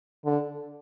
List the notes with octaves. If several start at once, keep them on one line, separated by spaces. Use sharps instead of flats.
D3